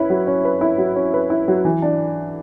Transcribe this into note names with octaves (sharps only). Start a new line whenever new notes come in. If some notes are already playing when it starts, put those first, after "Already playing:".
Already playing: C#4 E4 B4
F#3
C#4
B4
E4
F#3
C#4
B4
E4
F#3
E3
D4